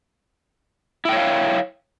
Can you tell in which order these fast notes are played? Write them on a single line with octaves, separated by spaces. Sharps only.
E4 G5 C#5 F5